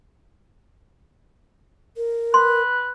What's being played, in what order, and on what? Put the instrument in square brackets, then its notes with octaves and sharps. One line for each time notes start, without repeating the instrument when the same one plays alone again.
[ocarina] A#4
[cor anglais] B4 [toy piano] C6